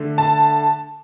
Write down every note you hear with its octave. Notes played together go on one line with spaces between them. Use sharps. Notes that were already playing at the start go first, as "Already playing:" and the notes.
Already playing: D3 A3
A5